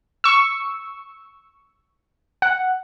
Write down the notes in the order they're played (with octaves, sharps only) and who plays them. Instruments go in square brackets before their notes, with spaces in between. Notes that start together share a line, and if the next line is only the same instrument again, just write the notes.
[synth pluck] C#6 E6
F#5